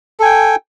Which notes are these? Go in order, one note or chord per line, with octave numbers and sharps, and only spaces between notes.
A4 G5 G#5